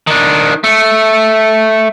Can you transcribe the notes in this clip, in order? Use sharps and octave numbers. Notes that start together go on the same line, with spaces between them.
D#3 D4
A3